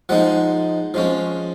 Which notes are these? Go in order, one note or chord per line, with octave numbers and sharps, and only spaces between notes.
F3 G#3 D#4 F#5
F3 G#3 C#4